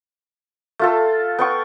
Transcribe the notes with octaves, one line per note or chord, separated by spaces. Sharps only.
A3 F4 A4
B3 G5 C#6